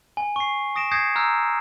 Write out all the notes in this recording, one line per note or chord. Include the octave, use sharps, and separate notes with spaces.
G#5
C#6 C7
D#6 A#6 D7 E7
D#6 G6 G#6 A#6 C7 C#7
A#5 E6 F6 G6